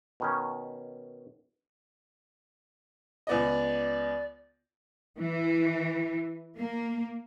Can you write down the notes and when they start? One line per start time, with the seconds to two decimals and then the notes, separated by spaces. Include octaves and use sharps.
0.20 B2 D#3 C#4
3.27 C#2 B3 D5 D#5
5.19 E3
6.58 A#3